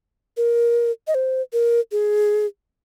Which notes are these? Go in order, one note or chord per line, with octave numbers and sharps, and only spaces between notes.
A#4
D#5
C5
A#4
G#4